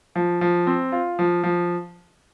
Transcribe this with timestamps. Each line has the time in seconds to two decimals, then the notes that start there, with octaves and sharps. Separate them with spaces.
0.15 F3
0.41 F3
0.67 C4
0.92 F4
1.19 F3
1.43 F3